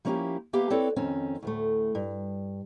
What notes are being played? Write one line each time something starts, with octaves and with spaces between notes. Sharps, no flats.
F3 A#3 C#4 D#4 E4 G4
A#3 B3 G4 B4 E5 F5
C4 E4 A4 B4 C#5 D5
F2 D#3 C4 C#4
D2 A2 A3
G2